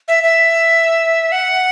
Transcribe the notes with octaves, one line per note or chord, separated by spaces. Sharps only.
E5
E5
F#5